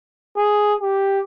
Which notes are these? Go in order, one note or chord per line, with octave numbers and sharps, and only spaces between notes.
G#4
G4